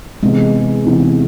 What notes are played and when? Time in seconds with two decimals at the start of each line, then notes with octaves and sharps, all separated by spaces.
0.23 C3 E3 G#3 B3
0.85 C3 E3 B3